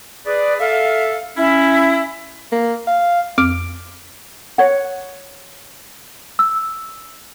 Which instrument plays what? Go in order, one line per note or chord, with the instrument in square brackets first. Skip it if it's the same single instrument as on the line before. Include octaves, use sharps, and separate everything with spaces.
[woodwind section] G#4 B4 D5
A4 E5 F5
C#4 E4
[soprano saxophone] A#3
F5
[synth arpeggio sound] F2 D6 F6 D7
[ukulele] C#5 F#5
[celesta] E6